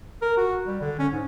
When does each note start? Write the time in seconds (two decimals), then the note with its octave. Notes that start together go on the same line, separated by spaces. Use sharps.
0.22 A#4
0.37 F#4
0.67 G3
0.81 D3
0.99 C#4
1.13 G#2